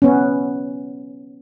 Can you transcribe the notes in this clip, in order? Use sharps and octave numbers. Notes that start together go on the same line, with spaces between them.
B3 C#4